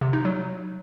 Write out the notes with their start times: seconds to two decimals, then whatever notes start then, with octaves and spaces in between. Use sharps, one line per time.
0.01 C3
0.13 D#4
0.25 F#3